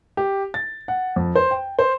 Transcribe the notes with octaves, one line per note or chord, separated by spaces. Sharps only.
G4
A6
F#5
F2
C5
G5
C5